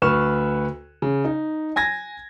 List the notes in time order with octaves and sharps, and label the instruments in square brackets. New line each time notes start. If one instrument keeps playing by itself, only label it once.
[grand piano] D2 B4 C#6 F6 E7
C#3
D#4
G#5 G#6 A#6